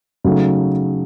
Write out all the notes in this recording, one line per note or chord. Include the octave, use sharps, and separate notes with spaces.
C#3 F#3 A3 D#4